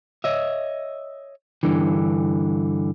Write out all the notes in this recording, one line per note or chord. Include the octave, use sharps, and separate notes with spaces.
C#5 D#5 E5
G2 D3 E3